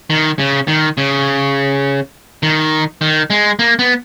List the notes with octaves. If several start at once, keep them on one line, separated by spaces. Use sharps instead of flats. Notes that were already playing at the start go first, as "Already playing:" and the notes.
D#3
C#3
D#3
C#3
D#3
D#3
G#3
A#3
B3